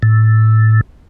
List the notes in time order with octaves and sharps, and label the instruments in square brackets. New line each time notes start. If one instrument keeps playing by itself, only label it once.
[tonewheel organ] A2